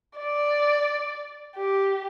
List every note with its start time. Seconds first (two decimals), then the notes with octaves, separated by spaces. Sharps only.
0.19 D5
1.56 G4